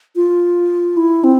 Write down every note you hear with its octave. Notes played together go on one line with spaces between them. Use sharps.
F4
E4
C4